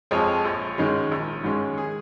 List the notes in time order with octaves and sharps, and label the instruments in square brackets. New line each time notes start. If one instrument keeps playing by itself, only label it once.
[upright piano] F2 F3 G#3 C#5
A#1
G#2 D#3 G#3 C#4
A#1
G#2 D#3 G#3 C#4
G#4